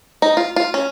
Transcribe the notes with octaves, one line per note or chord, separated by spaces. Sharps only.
D#4
F4
F4
C#4